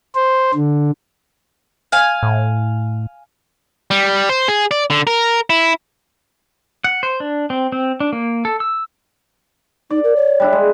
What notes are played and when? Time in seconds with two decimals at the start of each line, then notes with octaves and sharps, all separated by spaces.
0.15 C5
0.54 D3
1.92 F5 G#5
2.23 A2
3.91 G3
4.29 C5
4.48 G#4
4.71 D5
4.90 D3
5.07 A#4
5.50 E4
6.84 F#5
7.03 C5
7.20 D4
7.50 C4
7.72 C4
8.00 D4
8.13 A#3
8.45 A4
8.60 E6
9.90 D#4 D5
10.04 A#4
10.16 C#5
10.40 G3 D4 E4
10.52 G#3